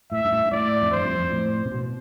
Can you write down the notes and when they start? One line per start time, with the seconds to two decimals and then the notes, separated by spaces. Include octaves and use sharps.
0.12 A2 E5
0.25 G2
0.32 A2
0.46 G2
0.52 A2 D5
0.82 F2
0.91 G2 C5
1.05 F2
1.19 F2
1.31 A2
1.65 C3
1.71 B2